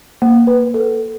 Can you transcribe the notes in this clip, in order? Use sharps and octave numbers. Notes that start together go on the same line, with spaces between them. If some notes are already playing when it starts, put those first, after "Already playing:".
A#3
B4
A4